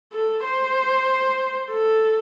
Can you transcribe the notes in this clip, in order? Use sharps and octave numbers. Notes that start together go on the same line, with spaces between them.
A4
C5
A4